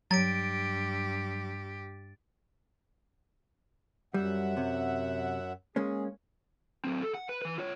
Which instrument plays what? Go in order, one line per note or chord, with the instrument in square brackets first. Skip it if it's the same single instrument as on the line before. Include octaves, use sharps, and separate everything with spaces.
[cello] G2 G4 [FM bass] F#3 [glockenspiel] A6 D7
[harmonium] F#2 E5 F#5 [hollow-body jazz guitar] G3
[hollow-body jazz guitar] C3
[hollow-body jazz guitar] G#3 A#3 C#4 [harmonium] G#4
[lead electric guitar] F#3 C4
A4
F#5
B4
E3 B4
F4 C#5